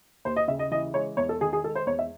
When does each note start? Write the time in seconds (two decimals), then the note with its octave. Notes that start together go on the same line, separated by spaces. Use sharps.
0.25 D#2 C5
0.36 D#5
0.48 C#3 E5
0.59 D#5
0.71 E3 D#5
0.94 G#3 C#5
1.17 E2 C#5
1.29 A4
1.41 D#3 G#4
1.53 G#4
1.63 G#3 A4
1.75 C5
1.87 E2 C#5
1.99 E5